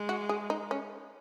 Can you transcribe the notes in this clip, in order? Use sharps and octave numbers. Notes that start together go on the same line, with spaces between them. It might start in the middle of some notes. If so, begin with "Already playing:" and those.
Already playing: G#3
F#4
G#4
D#4
C#4